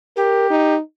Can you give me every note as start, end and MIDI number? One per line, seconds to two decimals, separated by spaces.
0.16 0.75 67
0.16 0.48 70
0.50 0.80 63